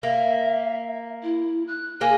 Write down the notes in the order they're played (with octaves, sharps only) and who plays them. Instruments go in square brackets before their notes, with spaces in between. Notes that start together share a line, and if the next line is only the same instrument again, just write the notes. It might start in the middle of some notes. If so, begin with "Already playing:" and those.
[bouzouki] A#3 [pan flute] E5
[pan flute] E4
F#6
[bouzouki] A#3 G#4 [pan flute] G#5